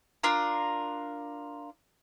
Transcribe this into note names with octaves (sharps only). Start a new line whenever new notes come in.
D4 F4 A#4